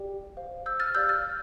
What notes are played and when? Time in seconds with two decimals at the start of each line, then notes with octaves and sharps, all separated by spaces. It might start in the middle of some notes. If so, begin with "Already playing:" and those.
Already playing: G4 D5 G5
0.37 C5 F5
0.66 E6 G6
0.80 F6 A6
0.95 G4 D5 F5 E6 G6
1.09 F6 A6